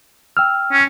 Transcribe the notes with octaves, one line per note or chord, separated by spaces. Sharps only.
G5 E6 F6
C#4